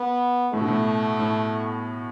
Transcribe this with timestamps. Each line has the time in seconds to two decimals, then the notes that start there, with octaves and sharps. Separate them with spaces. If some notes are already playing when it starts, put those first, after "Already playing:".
Already playing: B3
0.53 A2 A3
0.61 B2
0.68 A2
1.20 A2